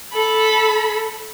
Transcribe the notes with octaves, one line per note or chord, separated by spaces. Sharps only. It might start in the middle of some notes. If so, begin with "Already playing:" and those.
A4 B5